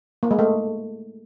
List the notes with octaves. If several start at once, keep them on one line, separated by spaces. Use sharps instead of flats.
A#3
G#3
A3